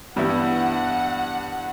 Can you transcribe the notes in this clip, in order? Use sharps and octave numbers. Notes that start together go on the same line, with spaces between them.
G2 E3 G3 B3 E4 F#5